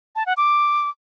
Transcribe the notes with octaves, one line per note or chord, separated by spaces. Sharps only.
A5
F#5
D6